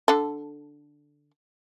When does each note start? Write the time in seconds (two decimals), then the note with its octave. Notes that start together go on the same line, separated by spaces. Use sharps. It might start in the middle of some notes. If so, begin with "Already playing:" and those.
0.08 D3 A4